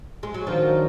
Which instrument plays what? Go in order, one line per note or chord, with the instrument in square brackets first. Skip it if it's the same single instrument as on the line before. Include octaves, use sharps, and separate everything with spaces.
[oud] G#3
F#3
[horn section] D#3 F#3 D4 F#4 A#4 [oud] F3